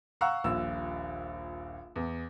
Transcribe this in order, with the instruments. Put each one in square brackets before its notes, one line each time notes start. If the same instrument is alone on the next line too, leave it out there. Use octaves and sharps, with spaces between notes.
[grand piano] F5 F#5 A#5 C#6 E6 F#6
D#1 A#1 E6
E2